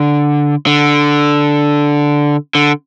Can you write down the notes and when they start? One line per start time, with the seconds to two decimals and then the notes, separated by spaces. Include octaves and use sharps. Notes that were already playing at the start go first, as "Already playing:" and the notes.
Already playing: D3
0.67 D3
2.55 D3